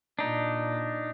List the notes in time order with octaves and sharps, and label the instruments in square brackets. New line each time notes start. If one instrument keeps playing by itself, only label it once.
[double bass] A#2 [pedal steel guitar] D4 D#4